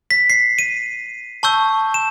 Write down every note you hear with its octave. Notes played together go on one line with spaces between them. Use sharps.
B6
C7
D#7
A5 C#6 E6 G6
E7